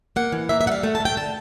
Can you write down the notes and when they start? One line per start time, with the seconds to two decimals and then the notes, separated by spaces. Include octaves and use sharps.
0.16 A#3 F#5
0.32 E3
0.49 A#3 E5
0.61 E5
0.66 G3 F#5
0.71 F5
0.83 A3 F#5
0.95 A5
1.00 A3
1.05 G5
1.17 D3 A5